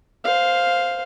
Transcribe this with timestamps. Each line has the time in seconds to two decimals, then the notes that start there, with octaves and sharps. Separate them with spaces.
0.24 C5 F5